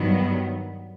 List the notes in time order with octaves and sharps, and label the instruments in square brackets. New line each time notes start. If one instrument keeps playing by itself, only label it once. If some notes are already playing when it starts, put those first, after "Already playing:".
Already playing: [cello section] G2 D#3 F#3 B3